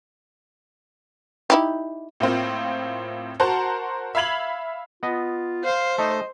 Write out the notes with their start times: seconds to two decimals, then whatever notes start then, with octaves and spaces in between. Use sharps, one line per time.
1.50 D#4 E4 G4
2.20 A2 A#3 C4 F4
3.40 F#4 A#4 C5 F#5 A5 A#5
4.15 E5 F5 B5 G#6 F7 F#7
5.03 B3 F4 D#5
5.65 C5 F5
5.98 A3 D#4 D#5